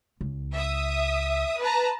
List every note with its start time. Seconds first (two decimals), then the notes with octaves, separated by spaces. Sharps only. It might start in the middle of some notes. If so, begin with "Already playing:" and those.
0.21 C#2
0.55 E5 D#6
1.61 B4 A5 A#5